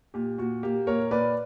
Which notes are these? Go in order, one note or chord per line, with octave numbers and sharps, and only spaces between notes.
A#2 G4
A#2 F#4
A#3 G4
A#2 A#4 C#5
A#2 B4 D5